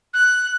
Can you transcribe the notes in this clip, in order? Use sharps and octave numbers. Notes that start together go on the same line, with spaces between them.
F#6